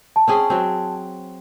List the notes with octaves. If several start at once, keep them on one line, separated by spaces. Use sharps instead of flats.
A5
C4 C#4 G#4
F#3 C4